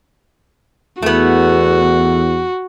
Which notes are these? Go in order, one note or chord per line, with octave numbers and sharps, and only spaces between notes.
E2 A3 B3 F#4